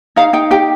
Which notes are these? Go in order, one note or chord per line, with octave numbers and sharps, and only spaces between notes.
D#4 F5
D#4 G5
G4 G5